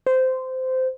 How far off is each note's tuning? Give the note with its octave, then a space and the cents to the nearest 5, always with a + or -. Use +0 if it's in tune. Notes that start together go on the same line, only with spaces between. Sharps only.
C5 -15